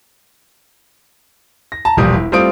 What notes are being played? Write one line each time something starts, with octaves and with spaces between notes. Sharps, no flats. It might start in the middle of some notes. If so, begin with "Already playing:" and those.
A#6
A5 A#5
E1 A#1 G3 D#6
E4
G3 A3 C4 F4 D#6 D7